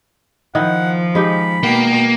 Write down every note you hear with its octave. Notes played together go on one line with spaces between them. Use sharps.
D#3 F3 D#4 E4 F#5
G#3 D#4 G4 B5
B2 A#3 G5